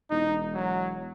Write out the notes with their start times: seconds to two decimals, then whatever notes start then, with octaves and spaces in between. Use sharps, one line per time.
0.10 E1 D#4
0.53 F#3